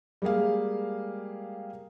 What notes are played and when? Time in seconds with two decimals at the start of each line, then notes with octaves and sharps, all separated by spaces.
0.22 G3 G#3 A#3 G#4 F5